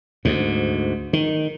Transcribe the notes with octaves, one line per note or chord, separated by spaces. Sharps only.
D2 G#2
D#3